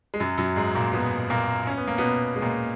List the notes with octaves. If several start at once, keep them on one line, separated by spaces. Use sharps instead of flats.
G#3
F#2 F#3
F#2 F#3
G#2 G#3
A#2 A#3
B2 B3
A#2 A#3
C#4
B3
A#3
B2 B3
G#3
A#2 A#3